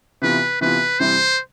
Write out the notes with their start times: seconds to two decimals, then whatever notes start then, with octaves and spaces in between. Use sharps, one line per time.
0.22 C3 E3 B3 F4 B4
0.61 C3 E3 B3 F4 B4
0.99 C3 E3 G3 C4 E4 C5